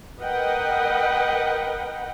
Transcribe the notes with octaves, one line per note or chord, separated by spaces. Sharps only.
A#4 B4 D#5 F#5 G5